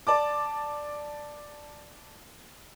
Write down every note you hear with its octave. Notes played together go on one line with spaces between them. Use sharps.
D5 A5 D6